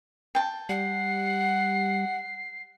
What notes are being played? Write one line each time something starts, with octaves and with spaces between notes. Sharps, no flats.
G5 A5
G3 F#5 C7